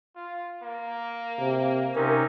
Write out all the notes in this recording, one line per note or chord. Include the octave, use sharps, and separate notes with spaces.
F4
A#3
C3
C3 C#4 D#4 A#4